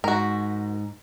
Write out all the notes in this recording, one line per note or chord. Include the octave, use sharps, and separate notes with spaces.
G#2 F#4 A#4